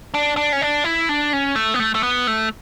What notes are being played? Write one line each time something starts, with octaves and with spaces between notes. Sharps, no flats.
D4
D4
C#4
D4
E4
D4
C#4
A3
B3
A3
A3
B3
A3